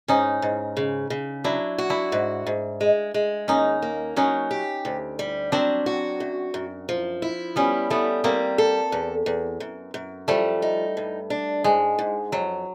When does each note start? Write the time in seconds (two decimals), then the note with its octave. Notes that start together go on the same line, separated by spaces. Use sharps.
0.08 G#2 C#4 D#4
0.42 G#2
0.77 C#3
1.10 C#3
1.44 F#3 D4 E4
1.78 F#4
1.90 D4 E4
2.12 G#2
2.46 G#2
2.81 G#3
3.14 G#3
3.48 D#2 C#4 D#4
3.82 A#3
4.16 F#3 C#4 D#4
4.51 G4
4.85 D2
5.19 G3
5.52 F#3 C4 D4
5.86 F#4
6.20 F#2
6.54 F#2
6.89 F3
7.22 E4
7.56 G3 B3 C#4
7.90 G3 A3 B3
8.24 G3 A#3 C4
8.58 A4
8.92 E2
9.26 E2
9.60 F#2
9.94 F#2
10.28 F3 G3 A3
10.62 D#4
10.97 G2
11.30 D4
11.64 G#2 G#3
11.99 G#2
12.32 F2 F#3